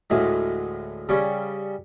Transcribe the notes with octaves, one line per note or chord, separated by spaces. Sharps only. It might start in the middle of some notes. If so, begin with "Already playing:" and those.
D2 A2 G#3
C#3 G3 C#4